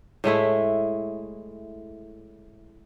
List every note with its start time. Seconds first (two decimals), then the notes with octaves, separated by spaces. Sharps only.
0.24 A2 G#3 A3 E4